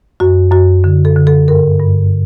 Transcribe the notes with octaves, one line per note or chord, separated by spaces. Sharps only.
F#2 F#4
F#2 F#4
D3
A4
D3
A4
G2 A#4
G2